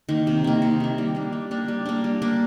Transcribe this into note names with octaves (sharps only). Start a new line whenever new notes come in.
D#3 A#3
C3
D#3 A#3
C3
D#3 A#3
G3
A#3 D4
G3
A#3 D4
G3
A#3 D4
G3
A#3 D4